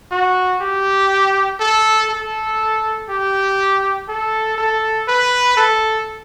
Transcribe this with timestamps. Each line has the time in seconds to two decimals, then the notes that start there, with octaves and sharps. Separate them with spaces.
0.11 F#4
0.61 G4
1.60 A4
2.10 A4
3.09 G4
4.08 A4
4.58 A4
5.08 B4
5.57 A4